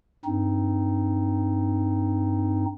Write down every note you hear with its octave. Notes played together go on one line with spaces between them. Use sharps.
G2 C4 D#4